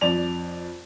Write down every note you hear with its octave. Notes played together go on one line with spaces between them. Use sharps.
F2 D5 F7